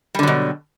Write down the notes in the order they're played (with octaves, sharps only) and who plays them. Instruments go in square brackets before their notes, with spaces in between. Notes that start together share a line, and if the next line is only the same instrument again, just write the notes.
[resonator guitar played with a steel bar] G3
D3
F#3
B2